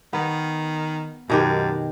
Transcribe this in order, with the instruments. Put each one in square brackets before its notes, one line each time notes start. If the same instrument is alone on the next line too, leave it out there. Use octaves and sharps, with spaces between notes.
[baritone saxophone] D#3 [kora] B3
[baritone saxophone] F#2 [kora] B2 D#3 G4